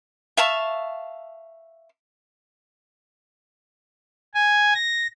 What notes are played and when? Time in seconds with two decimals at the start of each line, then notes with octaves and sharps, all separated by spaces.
0.37 E5 F5 A5 C#6
4.35 G#5
4.75 A#6